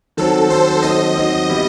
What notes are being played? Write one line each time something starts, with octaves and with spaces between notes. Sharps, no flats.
D#3 F#3 C4 A4
D#3 F#3 C4 C5
D#3 F#3 C4 D#5
D#3 F#3 C4
E3 G3 B3 E4 G4